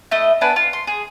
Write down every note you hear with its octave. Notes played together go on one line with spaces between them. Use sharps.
A3 E4 D#5
B3 D4 B4 G#5
F4
C6
G#4